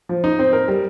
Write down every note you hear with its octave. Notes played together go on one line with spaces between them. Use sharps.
F3
D#4
C4
A#4
G3